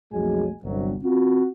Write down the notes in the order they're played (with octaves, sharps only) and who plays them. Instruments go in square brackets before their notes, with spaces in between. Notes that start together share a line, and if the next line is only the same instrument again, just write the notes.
[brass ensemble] B1 F2 F#3 G#3 A3 G#5
G1 C2 F#3
C4 F4 F#4